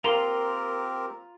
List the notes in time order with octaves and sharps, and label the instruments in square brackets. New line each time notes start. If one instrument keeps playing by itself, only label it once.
[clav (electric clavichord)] A#3 [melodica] C4 G4 A#4 [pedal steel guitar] F4 A#5 C6